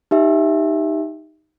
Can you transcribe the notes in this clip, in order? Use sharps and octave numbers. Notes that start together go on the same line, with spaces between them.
D#4 G4 E5